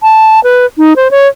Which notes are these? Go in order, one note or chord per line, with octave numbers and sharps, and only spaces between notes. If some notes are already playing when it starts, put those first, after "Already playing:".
A5
B4
D#4
C5
C#5